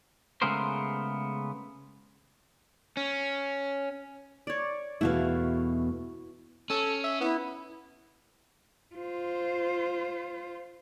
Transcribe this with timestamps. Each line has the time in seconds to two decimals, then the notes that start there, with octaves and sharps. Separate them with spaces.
0.42 C#3 G#3 A3 B3 A#4 C5
2.97 C#4
4.47 C#5 D5
5.01 E2 B2 A3 E4 F#4 F5
6.70 C#4 A4
7.04 E5
7.20 B3 E4
8.95 F4 C5